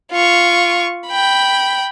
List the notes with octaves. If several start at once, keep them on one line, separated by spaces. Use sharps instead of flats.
F4 C#6
G5 B5